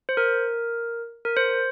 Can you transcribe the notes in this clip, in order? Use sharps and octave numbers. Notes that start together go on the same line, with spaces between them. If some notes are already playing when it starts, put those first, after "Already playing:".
C5
A#4
A#4
C5